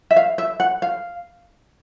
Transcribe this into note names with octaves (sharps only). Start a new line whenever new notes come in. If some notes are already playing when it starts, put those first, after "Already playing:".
E5
F5
E5
F#5
F5